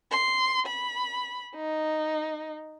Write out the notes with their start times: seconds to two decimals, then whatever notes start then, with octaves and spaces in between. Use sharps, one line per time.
0.12 C6
0.67 B5
1.56 D#4